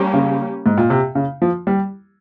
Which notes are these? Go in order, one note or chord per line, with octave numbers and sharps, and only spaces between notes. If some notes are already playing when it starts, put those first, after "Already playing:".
Already playing: G3 A#3 C#4 G4
C#3
G#2
A#2
C3
C#3
F3
G3